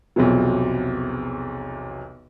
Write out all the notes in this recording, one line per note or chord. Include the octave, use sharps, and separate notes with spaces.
B1 E2 C3 F3 F#3